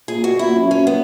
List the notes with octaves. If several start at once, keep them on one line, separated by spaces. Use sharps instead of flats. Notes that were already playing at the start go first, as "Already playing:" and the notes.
A#2 G#4
B2 F#4
A#2 E4
F#2
F#2 C#4
B3